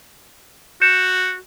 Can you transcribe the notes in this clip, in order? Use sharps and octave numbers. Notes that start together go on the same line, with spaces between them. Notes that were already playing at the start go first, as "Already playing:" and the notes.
F#4 G6 C#7 E7